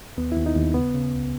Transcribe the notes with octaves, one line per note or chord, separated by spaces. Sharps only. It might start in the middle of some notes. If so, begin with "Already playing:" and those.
D#2 B3
D#2 E4
D#4
D#2
C#3 B3
C#3
C#2